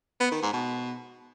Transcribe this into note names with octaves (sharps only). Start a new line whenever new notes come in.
B3
D#3
G#2
B2